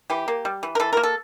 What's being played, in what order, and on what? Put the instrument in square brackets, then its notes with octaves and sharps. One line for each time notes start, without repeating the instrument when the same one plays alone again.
[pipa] E3 G4
A#3
G3
E3
A#4
E3 A4
A#3 A#4
A4